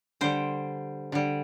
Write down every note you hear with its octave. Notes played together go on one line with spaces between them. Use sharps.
D3 G3 C5
D3 G3